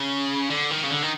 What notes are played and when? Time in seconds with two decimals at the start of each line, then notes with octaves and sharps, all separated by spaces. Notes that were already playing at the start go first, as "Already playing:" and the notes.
Already playing: C#3
0.50 D3
0.71 D#3
0.83 C#3
0.90 D3
1.02 D#3